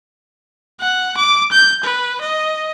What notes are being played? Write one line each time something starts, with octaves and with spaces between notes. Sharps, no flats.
F#5
D6
G6
B4
D#5